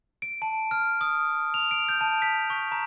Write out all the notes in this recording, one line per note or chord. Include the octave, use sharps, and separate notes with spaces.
D7
A5
F6
D#6
F7
D7
G6
A5
B6
C#6
A#5